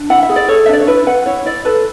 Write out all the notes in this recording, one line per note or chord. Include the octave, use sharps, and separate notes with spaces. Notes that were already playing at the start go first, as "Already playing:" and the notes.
Already playing: D4
E4 F#5
E5
G#4
D5
A4 C#5
E5
D4 D5
C#5
E4 B4
B4 F#5
E4 C#5
E4 D5
A4 B4